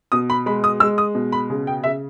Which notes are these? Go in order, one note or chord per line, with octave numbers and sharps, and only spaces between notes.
B2 D#6
B5
G#3 B5
D#6
G#3 E6
D#6
B2
B5
C#3
G5
C#3 E5